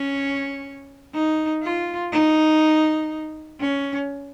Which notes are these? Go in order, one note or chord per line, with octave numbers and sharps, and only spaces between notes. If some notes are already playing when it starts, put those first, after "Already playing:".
Already playing: C#4
D#4
F4
D#4
C#4